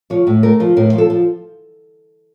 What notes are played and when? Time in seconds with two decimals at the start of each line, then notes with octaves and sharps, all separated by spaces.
0.10 F3 C#5
0.27 A2
0.43 A3 A#4
0.60 F3
0.76 A2 A#4
0.93 F3
0.98 A4
1.10 F3